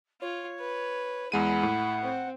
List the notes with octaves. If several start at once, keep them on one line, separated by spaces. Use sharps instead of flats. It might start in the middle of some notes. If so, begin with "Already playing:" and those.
F4 C#5
B4
E2 G#3 E4 F#5 D#7
A2
C4